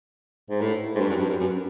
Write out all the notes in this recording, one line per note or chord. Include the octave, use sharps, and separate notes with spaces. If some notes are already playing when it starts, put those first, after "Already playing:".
G#2
A2
G#2
G2
F#2
G2
F#2
F#2